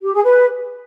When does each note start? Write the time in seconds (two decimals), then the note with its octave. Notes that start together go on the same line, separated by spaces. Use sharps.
0.02 G4
0.13 G#4
0.24 B4